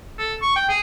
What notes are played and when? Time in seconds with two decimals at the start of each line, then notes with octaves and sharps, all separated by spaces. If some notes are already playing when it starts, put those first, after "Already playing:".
0.18 A4
0.42 C#6
0.56 G5
0.69 G#4